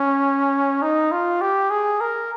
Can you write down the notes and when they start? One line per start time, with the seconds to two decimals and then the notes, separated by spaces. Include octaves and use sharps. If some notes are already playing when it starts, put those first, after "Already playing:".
Already playing: C#4
0.82 D#4
1.12 F4
1.41 G4
1.71 G#4
2.01 A#4